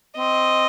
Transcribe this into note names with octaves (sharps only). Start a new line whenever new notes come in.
C4 D#5